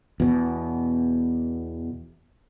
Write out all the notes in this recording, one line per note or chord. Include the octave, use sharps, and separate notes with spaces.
E2 B2